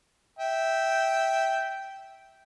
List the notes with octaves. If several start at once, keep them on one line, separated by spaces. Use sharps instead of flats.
E5 G5